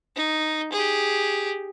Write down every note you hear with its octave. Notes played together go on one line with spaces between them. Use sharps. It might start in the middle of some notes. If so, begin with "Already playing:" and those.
D#4
G4 G#4